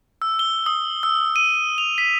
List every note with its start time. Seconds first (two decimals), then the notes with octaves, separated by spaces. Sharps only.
0.22 E6
0.39 G7
0.66 D#6
1.03 E6
1.36 D#7
1.78 F7
1.98 B6